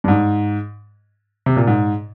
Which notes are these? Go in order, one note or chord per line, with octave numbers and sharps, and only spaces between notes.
G2
G#2
C3
A#2
G#2